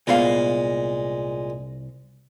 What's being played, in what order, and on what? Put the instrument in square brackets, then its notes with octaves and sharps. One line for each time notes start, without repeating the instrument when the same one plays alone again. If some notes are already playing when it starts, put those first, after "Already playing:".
[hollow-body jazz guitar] C2 B3 F5 [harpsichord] A#2 G#3